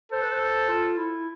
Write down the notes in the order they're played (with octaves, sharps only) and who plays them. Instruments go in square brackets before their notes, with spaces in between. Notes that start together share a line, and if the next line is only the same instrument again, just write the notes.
[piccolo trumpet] A4 [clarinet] C5
[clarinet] B4
C5
F4
E4